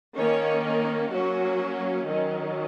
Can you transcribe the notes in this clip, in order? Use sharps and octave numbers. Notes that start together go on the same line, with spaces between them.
D#3 A#3 C#4 C#5
A#4
F#3 A#3 C#4 F#4
D#3 F#3 C#4